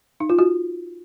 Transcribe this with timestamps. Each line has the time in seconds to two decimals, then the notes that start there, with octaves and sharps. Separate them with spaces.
0.20 D#4
0.29 F4
0.39 F#4